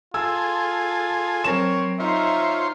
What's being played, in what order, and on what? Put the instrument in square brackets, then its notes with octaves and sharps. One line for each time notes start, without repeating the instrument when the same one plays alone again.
[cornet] F4 [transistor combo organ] G#4 A4 G#5 [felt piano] E6
[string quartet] F#3 C4 [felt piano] A#4 E7 [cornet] C#5
[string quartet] D#4 [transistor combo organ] F4 C5 C#5 [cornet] E5